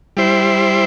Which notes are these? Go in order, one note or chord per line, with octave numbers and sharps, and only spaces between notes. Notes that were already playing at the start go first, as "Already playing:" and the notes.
G3 E4 C5